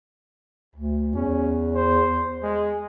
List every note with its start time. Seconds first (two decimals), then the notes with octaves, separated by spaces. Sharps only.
0.75 D2
1.15 E2 C#4
1.75 C5
2.43 G#3